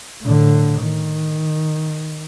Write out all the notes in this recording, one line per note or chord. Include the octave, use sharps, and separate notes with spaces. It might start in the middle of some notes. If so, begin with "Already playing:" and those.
A2 D3
D#3